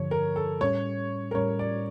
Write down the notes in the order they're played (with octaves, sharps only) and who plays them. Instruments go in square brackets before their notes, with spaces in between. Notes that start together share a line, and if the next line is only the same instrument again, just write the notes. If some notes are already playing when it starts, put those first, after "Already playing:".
Already playing: [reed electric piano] G2 D3 F3 [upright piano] C#5
[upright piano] A#4
A4
[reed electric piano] A2 G3 C#4 [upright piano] C#5
[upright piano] A#4
[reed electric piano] A2 G3 C#4 [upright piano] C#5
[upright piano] D5